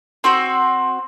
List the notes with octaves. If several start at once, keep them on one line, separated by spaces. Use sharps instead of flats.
C4 F#4 C5